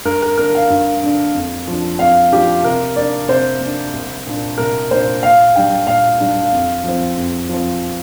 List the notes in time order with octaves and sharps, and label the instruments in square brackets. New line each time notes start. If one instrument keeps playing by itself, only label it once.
[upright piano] G2 A#4
A#4
D3 A#3 D4 A#4
F5
G2
D3 A#3 D4
F2
F3 D4
F2 F5
F3 D4 G4
C3 A#4
A#3 D4 D5
C3 C5
A#3
D4
C2
A#2 A#3 D4
C2 A#4
A#2 A#3 D4 C5
A#2 F5
G3 D4 G5
A#2 F5
G3 D4
F2
F3 C4
F2
F3 C4